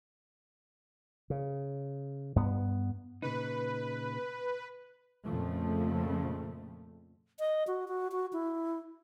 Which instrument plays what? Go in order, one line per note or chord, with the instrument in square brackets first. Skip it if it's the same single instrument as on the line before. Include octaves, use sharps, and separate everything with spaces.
[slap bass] C#3
G2 B3
[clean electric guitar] A#2 C#3 D#4 [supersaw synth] B4
[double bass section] F2 A#2 C#3 F3 A3
[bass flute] D#5
F#4
F#4
F#4
E4